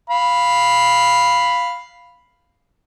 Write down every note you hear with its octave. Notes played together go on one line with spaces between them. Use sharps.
F5 B5